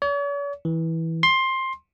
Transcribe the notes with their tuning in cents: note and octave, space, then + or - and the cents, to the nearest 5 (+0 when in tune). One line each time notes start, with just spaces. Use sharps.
C#5 +45
E3 -15
C6 +15